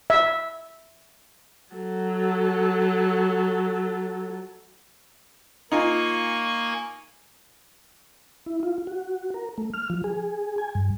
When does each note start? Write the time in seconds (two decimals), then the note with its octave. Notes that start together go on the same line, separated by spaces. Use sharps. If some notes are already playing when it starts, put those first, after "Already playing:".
0.10 E5
1.74 F#3 A4
5.72 A#3 D#4 F4 G#5 C#6
8.46 E4
8.63 F4
8.87 F#4
9.34 A#4
9.58 A3
9.74 F6
9.90 F3
10.04 G#4
10.58 G#5
10.75 G2